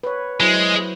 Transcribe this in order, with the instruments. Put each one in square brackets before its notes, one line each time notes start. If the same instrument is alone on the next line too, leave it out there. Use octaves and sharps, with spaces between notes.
[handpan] B4 C#5
[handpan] F#3 E4 C5 [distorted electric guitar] G#3